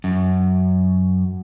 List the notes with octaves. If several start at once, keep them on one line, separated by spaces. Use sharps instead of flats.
F#2